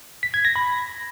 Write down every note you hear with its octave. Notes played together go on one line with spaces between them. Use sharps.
B6
G#6
A#6
B5